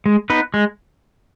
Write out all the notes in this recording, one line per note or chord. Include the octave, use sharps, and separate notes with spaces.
G#3
B3 D#4 B4
G#3